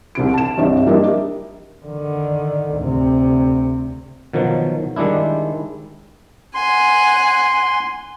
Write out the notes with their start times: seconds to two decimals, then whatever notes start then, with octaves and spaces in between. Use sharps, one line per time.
0.15 C2 C3 D7
0.34 A5 E7
0.57 C2 G2 C3 D#4 C#5 E5
0.86 G3 A#3 D4 D#4 D#5 E5
1.86 D3 D#3
2.76 D2 C3
4.33 B2 D#3 F3 F#3
4.96 D#3 G3 G#3 D4 E4
6.55 F#5 G#5 C6